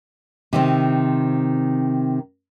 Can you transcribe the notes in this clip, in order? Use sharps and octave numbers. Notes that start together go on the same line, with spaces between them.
C3 D#3 C4